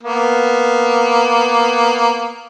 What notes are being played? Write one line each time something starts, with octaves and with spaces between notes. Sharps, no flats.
A#3 B3